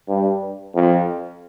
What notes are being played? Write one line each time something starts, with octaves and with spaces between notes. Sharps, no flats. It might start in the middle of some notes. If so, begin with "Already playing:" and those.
G2
F2